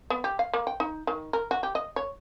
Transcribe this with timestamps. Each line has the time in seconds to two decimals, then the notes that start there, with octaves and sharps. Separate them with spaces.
0.10 B3
0.24 G4
0.39 F5
0.53 A#3
0.67 G5
0.80 D#4
1.07 D#3
1.33 A#4
1.51 F#4
1.63 G4
1.75 D#5
1.96 C#5